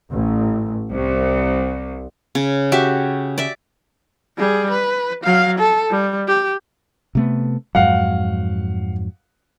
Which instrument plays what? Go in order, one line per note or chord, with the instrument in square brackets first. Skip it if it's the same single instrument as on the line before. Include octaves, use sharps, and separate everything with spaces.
[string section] A1
C2
[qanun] C#3
F#4 G4 E5
D5 E5
[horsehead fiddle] G3 G#4
B4
F#3 F5
A4
G3
G4
[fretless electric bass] C3 A3 B3
[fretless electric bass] F2 G#2 F#3 [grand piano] F5 F#5